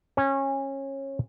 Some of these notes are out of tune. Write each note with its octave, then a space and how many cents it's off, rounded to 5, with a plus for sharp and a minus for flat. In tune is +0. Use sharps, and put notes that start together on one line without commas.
C#4 -20